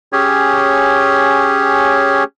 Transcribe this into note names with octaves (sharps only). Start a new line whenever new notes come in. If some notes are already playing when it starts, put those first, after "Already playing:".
C#4 G4 G#4 C#5